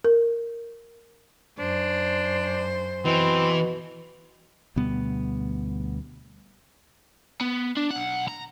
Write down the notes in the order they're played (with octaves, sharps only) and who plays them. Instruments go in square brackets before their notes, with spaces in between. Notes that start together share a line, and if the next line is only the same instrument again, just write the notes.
[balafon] A#4
[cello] F#2 C5 [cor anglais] D4
[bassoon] B2 [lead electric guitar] E3 [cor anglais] C4
[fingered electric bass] D2 B2 G3 B3
[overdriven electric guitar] B3
D4
B1 F#5
A#5